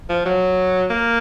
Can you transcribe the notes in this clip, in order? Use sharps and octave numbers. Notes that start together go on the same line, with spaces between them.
F3
F#3
A#3